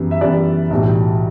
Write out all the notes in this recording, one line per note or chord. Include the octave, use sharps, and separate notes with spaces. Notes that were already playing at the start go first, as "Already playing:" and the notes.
Already playing: F#2 E3 G3 B3
E5
F#2 E3 G3 B3 D5
B1 A2 E3 G3